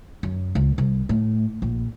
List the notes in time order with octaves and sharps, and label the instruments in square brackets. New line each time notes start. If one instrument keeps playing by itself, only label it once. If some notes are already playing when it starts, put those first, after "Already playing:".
[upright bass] F#2
C#2
C2
A2
A#1